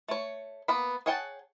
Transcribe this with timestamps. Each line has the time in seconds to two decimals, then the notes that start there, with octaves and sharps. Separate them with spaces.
0.09 A3 C#5
0.68 A#3 B3 B5
1.06 G#4 C#5 F#5 G5 A5